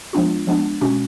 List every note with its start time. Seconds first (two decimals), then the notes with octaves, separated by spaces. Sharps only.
0.13 F3 G#3 B3 D4 F4
0.47 F3 G#3 B3 D4
0.81 B2 G#3 C#4 F#4